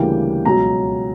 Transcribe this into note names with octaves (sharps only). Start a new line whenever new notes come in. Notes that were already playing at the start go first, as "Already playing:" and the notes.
Already playing: D2 C#3 E3 G3 A#3 G5
C#2 B2 F#3 C#4 A#5